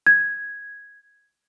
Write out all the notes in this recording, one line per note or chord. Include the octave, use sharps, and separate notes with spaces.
G#6